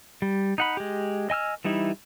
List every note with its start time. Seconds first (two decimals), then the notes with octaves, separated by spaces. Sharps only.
0.22 G3
0.58 D#4 F#5 B5
0.77 G#3 G4
1.30 D#5 G#5 E6 F6
1.65 E3 G3 D#4 E4